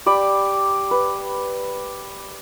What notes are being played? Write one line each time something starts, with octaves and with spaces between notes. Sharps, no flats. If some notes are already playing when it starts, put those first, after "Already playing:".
G4 D5 B5
B4